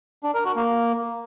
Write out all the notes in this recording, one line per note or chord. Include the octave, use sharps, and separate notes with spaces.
D4
A#4
F#4
A#3